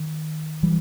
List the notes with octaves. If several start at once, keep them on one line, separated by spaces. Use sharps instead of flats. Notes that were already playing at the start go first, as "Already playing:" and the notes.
Already playing: D#3
E3 G3